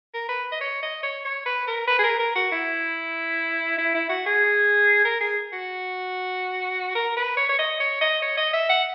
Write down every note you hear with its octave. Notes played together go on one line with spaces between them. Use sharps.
A#4
B4
D#5
C#5
D#5
C#5
C#5
B4
A#4
B4
G#4
A#4
A#4
F#4
E4
E4
E4
F#4
G#4
A#4
G#4
F#4
A#4
B4
C#5
C#5
D#5
C#5
D#5
C#5
D#5
E5
F#5